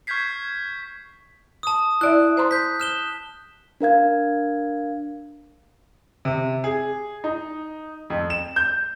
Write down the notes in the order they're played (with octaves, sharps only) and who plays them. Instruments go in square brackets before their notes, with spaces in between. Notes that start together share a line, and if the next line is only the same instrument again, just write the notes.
[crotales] C#6 F6 G6 G#6 B6 C7
[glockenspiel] A5 D#6
[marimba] E4 D5 E5 [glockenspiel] F#6
[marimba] C5 A#5 C6
[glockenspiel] G6 B6
F6 E7 G7
[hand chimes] D4 A#4 F5 G#6
[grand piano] C3
G#4
D#4
F2
E7
G6